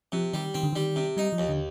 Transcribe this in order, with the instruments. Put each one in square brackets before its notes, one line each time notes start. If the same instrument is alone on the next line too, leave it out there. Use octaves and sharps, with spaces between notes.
[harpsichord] C3 [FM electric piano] F3
[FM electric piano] D#3 [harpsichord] G3
[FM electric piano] D#3 [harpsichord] C4
[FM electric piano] D3
[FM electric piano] D#3 [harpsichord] G3
[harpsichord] C3
[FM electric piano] G3 [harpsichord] D#4
[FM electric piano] F3
[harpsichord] D#2
[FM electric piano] D3